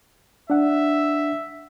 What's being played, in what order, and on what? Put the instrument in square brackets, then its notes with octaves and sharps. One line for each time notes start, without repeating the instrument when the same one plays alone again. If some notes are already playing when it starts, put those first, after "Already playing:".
[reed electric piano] D4 F#5 [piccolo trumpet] E5